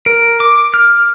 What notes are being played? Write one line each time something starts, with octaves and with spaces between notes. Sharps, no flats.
A#4
D6
F6